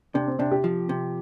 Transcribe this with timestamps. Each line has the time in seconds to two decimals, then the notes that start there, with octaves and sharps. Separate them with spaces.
0.14 C3 D4
0.27 C4
0.39 C3 D4
0.52 G4
0.64 F3
0.89 C3